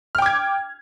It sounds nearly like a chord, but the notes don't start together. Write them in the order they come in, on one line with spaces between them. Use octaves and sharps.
F6 G5 D6 G#6